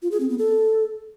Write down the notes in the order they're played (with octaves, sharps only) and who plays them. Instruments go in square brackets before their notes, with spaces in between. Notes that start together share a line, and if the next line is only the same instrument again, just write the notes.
[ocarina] F4
G#4
C4
B3
A4